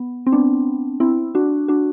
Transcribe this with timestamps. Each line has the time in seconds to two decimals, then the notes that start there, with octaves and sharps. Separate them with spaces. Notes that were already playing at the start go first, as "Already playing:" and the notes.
Already playing: B3
0.27 C4
0.32 B3 D4
1.00 C4 E4
1.35 D4 F#4
1.68 D4 F#4